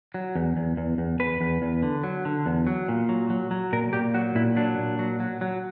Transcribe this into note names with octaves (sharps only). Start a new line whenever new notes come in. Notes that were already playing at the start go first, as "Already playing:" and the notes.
F#3
E2
E2
E2
E2
E2 B4
E2
E2
D3
F#3
D3
E2
F#3
A#2
F#3
F#3
F#3
A#2 A#4
A#2 G4
F#3 F#4
A#2 E4
F#3 D4
A#2
F#3
F#3
F#3